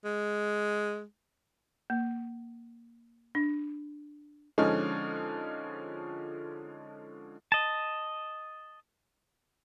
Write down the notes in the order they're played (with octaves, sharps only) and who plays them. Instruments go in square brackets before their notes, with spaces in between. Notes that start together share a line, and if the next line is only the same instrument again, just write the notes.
[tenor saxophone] G#3
[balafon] A#3
D4
[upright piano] D3 F3 G#3 C#4 D#4
[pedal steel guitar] D#5 A5